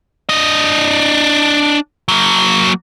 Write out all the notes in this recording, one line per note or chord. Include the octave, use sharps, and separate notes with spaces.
D4 D#5
F#3 A#3